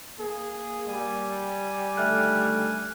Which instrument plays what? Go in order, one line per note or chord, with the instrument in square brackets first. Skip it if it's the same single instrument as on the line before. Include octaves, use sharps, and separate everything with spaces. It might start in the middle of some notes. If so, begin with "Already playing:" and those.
[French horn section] A#3 [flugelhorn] G#4
[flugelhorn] G3 [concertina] G#5
[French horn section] D3 D#3 A3 [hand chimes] E5 F6 F#6